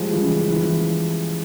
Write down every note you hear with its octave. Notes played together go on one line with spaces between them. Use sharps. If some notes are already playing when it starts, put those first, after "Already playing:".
Already playing: F3 G3 G#3
E3
C#3
E3